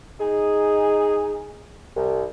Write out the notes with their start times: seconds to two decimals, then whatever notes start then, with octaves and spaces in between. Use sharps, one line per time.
0.21 D#4 G#4
1.97 C2